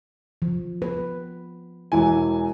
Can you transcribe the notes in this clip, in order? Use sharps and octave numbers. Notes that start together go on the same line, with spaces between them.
F3
B4
E1 E3 G#5